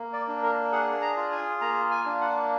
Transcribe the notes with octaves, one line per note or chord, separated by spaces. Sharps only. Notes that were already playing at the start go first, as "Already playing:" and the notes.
Already playing: A#3
D5
D4
A#4
G#4 F#5
A#5
F4
G#5
A#3 A#5
G#5
D4
F#5